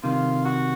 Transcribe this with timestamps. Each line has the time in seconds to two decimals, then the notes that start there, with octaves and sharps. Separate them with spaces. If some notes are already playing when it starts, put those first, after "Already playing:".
0.03 C2 C3 D#3 F4
0.45 F#4